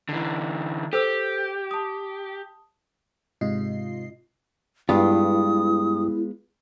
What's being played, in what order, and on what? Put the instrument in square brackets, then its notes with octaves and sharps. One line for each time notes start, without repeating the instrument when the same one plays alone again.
[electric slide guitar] D3 E3
[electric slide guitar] G4 [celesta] A4 C5 E6
[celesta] A5 D#6
[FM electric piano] G#2 C3 F4 D#5 C7
[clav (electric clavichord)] G2 [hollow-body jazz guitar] G#3 B3 F4 [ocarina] E4 [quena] D#6